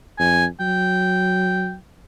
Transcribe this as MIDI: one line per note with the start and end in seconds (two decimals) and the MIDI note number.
0.19 0.47 41
0.19 0.45 80
0.60 1.76 54
0.60 1.74 79